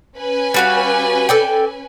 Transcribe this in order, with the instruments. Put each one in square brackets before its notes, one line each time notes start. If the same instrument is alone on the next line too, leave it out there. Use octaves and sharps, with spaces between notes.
[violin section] C#4 B4 G#5
[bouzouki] G3 F#4 F5
A4 D5 G5